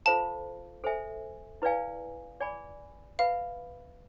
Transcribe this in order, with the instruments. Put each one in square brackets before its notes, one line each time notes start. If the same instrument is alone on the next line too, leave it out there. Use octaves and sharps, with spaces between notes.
[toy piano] F4 A4 C5 F5 [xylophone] A5
[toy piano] A4 C5 E5 G#5
E4 B4 D5 F5 G#5
G#4 D5 G#5 B5
[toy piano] B4 E5 B5 [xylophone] F5